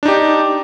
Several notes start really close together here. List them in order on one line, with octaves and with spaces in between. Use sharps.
D4 D#4 G4